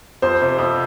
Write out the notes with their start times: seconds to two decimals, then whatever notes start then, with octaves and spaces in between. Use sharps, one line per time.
0.22 F2 C5
0.41 C3
0.58 F2